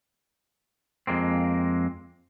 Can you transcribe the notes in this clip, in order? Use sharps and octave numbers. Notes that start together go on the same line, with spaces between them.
F2 G#3 A#3 C4